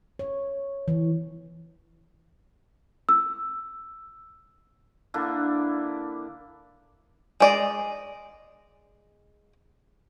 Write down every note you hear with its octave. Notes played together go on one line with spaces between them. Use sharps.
C#5
E3
E6
D3 A#3 D4 E4
G#3 D5 D#5